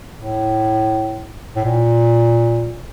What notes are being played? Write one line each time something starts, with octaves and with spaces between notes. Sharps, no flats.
A2
A2
A#2